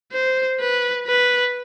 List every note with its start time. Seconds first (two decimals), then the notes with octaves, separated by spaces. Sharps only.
0.12 C5
0.60 B4
1.07 B4